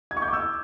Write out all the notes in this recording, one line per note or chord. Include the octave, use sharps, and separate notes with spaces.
G#6
C#6
G6
D6
E6